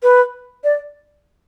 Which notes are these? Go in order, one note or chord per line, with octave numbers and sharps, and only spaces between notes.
B4
D5